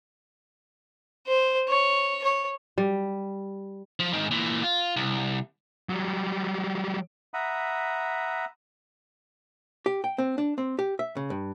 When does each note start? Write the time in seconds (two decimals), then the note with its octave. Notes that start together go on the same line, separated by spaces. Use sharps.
1.27 C5
1.69 C#5
2.23 C#5
2.78 G3
4.00 F3
4.13 G#2 D#3
4.31 A#2 E3
4.63 F4
4.97 C2
5.89 F#3 G3
7.34 E5 F#5 A#5 B5 D#6
9.86 G4
10.04 G5
10.18 C4
10.38 D4
10.58 C4
10.79 G4
10.99 E5
11.17 C#3
11.30 G2